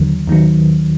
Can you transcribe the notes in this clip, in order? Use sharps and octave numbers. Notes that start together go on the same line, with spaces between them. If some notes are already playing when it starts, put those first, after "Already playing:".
Already playing: D#2 D3 F#3
D#2 D#3 F#3